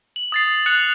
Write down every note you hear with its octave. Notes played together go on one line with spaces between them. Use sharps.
F#7
D#6 A6 C7
F#6 C#7 F7